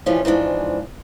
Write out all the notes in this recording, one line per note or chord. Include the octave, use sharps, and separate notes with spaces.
E3 F3 G3 C#4 F4
G#2 E3 F3 D4